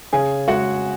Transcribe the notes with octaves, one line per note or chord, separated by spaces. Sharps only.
C#3 G#4 G#5
G#3 F#4 F#5